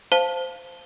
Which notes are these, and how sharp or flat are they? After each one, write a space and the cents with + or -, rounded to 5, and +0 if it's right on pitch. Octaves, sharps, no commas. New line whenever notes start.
C5 -10 F5 +0 A5 +0